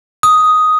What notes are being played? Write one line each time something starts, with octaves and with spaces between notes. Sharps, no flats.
D#6